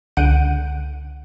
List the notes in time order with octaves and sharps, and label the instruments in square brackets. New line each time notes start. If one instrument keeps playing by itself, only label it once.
[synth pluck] C#2 D3 F#5 G6 D7 D#7